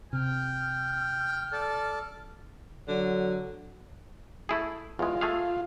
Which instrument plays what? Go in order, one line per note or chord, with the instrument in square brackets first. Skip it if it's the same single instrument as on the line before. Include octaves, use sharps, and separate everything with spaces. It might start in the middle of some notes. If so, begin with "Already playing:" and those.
[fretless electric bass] C3 [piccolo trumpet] G5 [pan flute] F6
[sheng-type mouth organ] A4 D5
[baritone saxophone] D3 [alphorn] F#3
[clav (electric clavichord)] A3 E4 G#4
[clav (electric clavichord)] E2 G#3 [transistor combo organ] F4
[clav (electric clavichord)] A3 G#4 F5